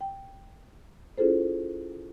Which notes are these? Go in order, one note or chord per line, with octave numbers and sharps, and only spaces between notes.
G5
C#4 E4 F4 G#4 A4 C5